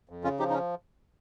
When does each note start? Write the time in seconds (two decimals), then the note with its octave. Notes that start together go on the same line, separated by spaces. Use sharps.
0.09 F2
0.24 C#3 C#4 F4
0.39 F3 D#4 G4
0.50 D#4
0.54 C#4